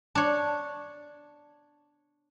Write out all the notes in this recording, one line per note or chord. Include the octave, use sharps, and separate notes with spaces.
D4 C#5